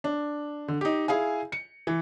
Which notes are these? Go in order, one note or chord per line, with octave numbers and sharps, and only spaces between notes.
D4
D3
D#4 G4
E4 G#4 F5 G#5
C#7
E3